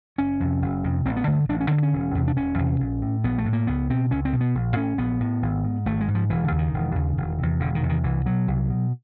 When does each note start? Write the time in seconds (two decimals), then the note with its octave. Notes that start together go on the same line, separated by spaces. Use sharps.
0.18 F#1 C#4
0.40 F2 C3
0.62 F#1
0.84 F2 C3
1.06 A1 C4
1.16 B3
1.28 G2 D3 A3
1.49 A1 D4
1.60 C#4
1.71 D3 C4
1.76 G2
1.83 C#4
1.93 E1
2.14 E2 C3
2.28 D4
2.36 E1 C#4
2.58 E2 C3
2.80 A#1
3.02 A2
3.24 A#1 B3
3.38 A3
3.46 A2
3.53 A#3
3.67 C#2 B3
3.90 B2 C4
4.11 C#2 C#4
4.25 C4
4.33 B2
4.41 B3
4.55 A#1
4.76 A2 C#4
4.98 A#1 B3
5.20 A2
5.42 G#1
5.64 G#2
5.86 G#1 A3
6.01 G#3
6.08 G#2
6.15 F3
6.29 E1 E3
6.44 D3
6.52 D#2 C#3
6.58 D#3
6.73 E1
6.95 D#2 C#3
7.17 E1
7.39 E2 C3
7.60 E1 D3
7.75 D#3
7.83 E2 C3
7.89 D#3
8.04 C2 E3
8.26 B2 F#3
8.48 C2
8.69 B2